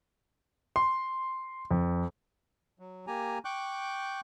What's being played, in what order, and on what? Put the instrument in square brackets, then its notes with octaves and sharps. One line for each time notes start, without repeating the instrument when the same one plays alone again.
[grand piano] C6
F2
[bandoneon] F#3
A#3 G4 G#5 A#5
G5 C#6 D6 F#6 G6